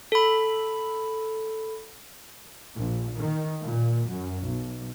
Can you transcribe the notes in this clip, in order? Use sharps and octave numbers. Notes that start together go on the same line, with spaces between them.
A4 B5
A#1
D#3
A#2
F#2
B1